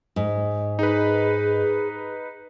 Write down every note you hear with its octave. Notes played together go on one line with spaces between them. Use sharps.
G#2
D#4 G#4 B4